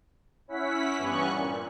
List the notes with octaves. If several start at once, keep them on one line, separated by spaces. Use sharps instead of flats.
C#4 E4 F#5 B6
G2 E3 B3 C#4 C#6 F#6
A#2